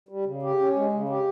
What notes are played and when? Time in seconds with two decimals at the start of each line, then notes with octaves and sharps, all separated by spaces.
0.09 G3
0.25 C#3
0.43 G4
0.59 C#4
0.76 G#3
0.93 C#3
1.09 G4